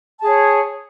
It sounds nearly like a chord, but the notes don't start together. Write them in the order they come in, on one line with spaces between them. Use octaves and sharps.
A5 G#4 C#5